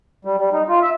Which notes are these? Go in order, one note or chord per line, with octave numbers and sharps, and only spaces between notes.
G3
G3
D#4
F4
E5